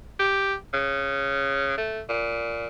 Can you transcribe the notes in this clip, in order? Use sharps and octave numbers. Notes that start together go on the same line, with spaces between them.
G4
C#3
A3
A#2